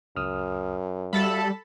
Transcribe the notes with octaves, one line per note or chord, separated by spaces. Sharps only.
C#2 F#2 D#6 F6
G3 F#4 A4 E5 F5 A5 B5